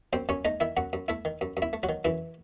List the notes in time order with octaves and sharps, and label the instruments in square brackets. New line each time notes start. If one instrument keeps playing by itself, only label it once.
[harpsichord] F#2 C4 C5
F#2 C#4 C#5
A3 D#4 D#5
D#3 E4 E5
F#2 F#4 F#5
F#2
A3 E4 E5
D#3
F#2
F#2
E4 E5
A3
F#3 F#4
D#3
F#2 E3 E4